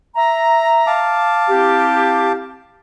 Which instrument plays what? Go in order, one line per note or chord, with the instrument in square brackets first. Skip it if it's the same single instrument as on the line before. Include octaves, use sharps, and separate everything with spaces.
[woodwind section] E5 A#5
[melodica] F5 A5 D6
[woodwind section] C4 E4 G4